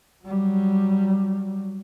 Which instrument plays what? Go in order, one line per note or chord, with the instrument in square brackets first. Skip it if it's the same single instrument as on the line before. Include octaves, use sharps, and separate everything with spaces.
[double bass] F#3 G3